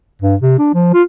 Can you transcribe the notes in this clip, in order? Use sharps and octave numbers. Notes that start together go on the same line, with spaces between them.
G2
C3
D4
F3
F4